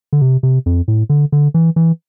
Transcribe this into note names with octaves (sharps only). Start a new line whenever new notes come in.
D3
C3
C3
F2
A2
D3
D3
E3
E3